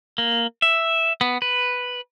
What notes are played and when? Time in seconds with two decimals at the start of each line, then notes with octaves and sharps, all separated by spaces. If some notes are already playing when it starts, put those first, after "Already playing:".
0.18 A#3
0.62 E5
1.21 B3
1.42 B4